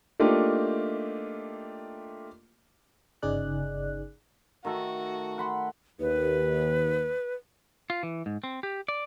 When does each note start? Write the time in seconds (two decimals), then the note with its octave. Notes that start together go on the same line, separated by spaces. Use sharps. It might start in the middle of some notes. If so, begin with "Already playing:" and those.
0.20 A3 A#3 D4 D#4 F4 G4
3.22 G1 C#3 D#4 G#4 D5 F#6
4.65 D#3 A3 F#4 A4
5.38 F#5 B5 C6
6.00 D#2 B4
7.90 F4
8.03 E3
8.26 G#2
8.44 C4
8.63 G4
8.88 D5